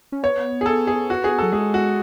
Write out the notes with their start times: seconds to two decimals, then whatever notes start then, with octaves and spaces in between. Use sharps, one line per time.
0.12 C#4
0.23 B3 C#5
0.61 G#4
0.66 A4
0.87 G#4
1.10 F#4
1.24 G#4
1.38 F#3 A4
1.52 G#3 G#4
1.74 F#4